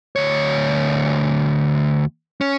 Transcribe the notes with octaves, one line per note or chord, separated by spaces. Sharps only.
D2 C#5
C#4